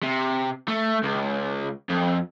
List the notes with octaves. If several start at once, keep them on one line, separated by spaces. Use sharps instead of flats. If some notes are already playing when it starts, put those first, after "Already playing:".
C3
A3
C#2
F2